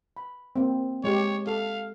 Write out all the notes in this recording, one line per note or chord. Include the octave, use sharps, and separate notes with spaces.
B5
A#3 C4
G#3 G4 C#5
A4 F5